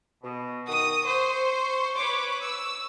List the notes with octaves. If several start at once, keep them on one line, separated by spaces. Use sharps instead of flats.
B2
D#3 F#4 D#6
C5 C#6
B4 C#5 D6
E6